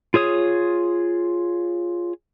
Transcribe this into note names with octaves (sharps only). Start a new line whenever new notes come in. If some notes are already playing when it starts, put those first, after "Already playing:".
F4 G#4 C#5 D#6